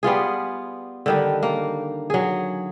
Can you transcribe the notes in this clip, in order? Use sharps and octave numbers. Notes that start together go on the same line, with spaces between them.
G3 B3 F4 G#4
D3 D#3 G3
A#3
F#3 G#4